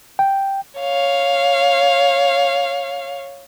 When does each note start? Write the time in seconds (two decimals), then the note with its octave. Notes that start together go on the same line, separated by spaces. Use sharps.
0.19 G5
0.80 C#5 F5